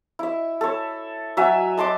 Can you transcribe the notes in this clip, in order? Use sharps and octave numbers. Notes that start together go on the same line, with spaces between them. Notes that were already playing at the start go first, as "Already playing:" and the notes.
E4 E5
A4 C#5
F#3 E5 G#5
D#5 A5 C6 D6